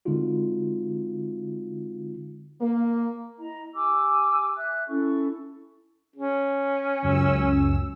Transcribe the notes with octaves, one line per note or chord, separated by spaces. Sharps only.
D3 G#3 C4 D#4 F4 F#4
A#3
E4 D#5 A#5
G4 G#5 D6 E6
E5 F#6
C#4 E4 A4 C#6
C#4
C#2 F#2 E6